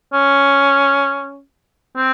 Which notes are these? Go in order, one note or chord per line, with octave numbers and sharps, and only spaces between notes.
C#4
C4